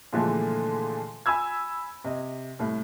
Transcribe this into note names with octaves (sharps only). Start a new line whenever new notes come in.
A#2 D3 E3 F3 G#3 A3
G#5 B5 E6 G#6
C3 D#5
C2 A2